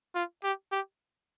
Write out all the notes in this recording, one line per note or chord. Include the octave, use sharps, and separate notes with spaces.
F4
G4
G4